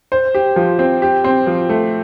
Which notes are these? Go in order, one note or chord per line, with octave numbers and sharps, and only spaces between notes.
C5
G4
F3
C4
G4
C4
F3
A3